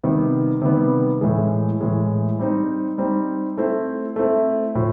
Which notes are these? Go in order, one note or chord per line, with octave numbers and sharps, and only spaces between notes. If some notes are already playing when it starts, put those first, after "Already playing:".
C3 D#3 G3 B3
C3 D#3 G3 B3
A2 E3 G#3
A2 E3 G#3
G3 C4 D#4
G3 C4 D#4
A3 C4 E4
A3 C4 E4
A2 F3